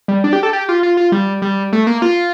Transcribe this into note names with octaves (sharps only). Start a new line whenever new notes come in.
G3
D4
G4
A4
G4
F4
F4
F4
G3
G3
A3
A#3
F4